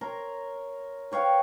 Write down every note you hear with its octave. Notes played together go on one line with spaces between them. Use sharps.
A#4 C#5 A#5 C6
B4 C#5 F5 G5